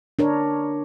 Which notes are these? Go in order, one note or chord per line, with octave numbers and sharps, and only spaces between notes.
D4 A#4 C#5